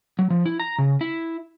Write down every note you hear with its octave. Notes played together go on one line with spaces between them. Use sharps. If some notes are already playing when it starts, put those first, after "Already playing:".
F#3
F3
E4
A#5
C#3
E4